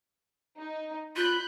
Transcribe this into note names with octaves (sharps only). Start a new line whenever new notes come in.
D#4
F4 B5 F#6 G6